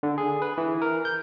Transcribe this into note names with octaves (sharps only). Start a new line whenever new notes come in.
D3
G#4
B4
E3
A#4
G6